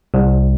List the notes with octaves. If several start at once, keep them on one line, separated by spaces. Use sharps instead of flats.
C2